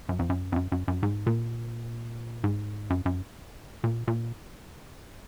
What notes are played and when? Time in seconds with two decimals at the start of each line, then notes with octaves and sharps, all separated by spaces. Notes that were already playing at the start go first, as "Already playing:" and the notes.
0.09 F#2
0.19 F2
0.30 F#2
0.52 F2
0.56 F#2
0.72 F#2
0.88 F#2
1.03 G#2
1.27 A#2
2.44 G#2
2.90 F#2
3.06 F#2
3.84 A#2
4.08 A#2